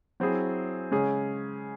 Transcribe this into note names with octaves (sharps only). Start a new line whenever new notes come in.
F#3 C4 E4 G#4
C#3 G#3 C#4 G#4